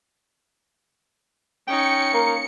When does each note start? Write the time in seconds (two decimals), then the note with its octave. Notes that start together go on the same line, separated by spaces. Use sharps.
1.68 C#4 D#4 G5 C#7
2.13 A#3 A#4